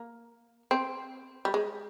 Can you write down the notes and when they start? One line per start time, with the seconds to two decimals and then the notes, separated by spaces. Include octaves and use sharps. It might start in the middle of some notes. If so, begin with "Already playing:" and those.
Already playing: A#3
0.71 C4
1.45 G3
1.54 G#3